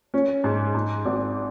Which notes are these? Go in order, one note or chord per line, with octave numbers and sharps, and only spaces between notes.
C#4
G#2
G#2
G#1